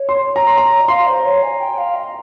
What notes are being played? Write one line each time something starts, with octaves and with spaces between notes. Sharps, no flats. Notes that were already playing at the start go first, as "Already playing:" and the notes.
Already playing: C#5
C6
A#5
C6
A#5
D#5
F5 C6
C5
C#5
G#5
G5
F5
D#5